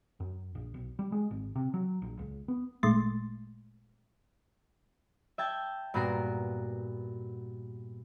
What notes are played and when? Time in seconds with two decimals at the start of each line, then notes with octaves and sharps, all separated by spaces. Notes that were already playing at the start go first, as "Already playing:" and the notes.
0.20 F#2
0.55 A#1
0.74 B1
0.99 G3
1.12 G#3
1.31 G#1
1.56 C3
1.74 F#3
2.02 A#1
2.19 C#2
2.48 B3
2.83 G#1 A#2 G#3 A3 C6 A6
5.38 E5 G5 A5 G#6
5.94 G2 A#2 B3 F#4 A#4 C7